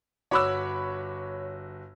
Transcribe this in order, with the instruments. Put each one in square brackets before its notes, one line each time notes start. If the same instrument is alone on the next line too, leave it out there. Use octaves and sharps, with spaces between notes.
[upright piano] G1 F#4 D6 [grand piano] C#5 B5 E6